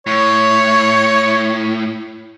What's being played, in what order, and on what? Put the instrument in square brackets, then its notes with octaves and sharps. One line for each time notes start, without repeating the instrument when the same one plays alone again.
[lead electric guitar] A2 [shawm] C#5